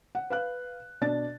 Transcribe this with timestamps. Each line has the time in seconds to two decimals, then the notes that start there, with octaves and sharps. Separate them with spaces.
0.15 F#5
0.30 B4 F5 F#6
1.01 B2 D4 D5 A6